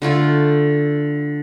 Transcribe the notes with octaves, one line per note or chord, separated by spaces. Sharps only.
D3 A3 F4 A4